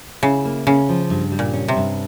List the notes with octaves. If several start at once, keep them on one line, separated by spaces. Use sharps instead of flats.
C#3 E4
A#3
C#3 C#4
F3
G2
G3
A#2
C#4
C3
G2